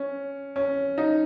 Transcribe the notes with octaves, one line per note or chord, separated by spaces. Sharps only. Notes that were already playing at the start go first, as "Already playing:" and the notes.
Already playing: C#4
C#4
D#4